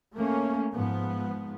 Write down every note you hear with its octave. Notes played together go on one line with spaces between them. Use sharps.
A3 A#3 C#4
G#2 F3 B3